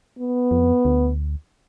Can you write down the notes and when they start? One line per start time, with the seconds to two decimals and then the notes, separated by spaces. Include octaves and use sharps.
0.19 B3
0.51 F2
0.85 D2